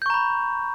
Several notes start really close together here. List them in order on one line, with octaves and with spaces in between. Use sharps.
G6 C#6 A#5 B5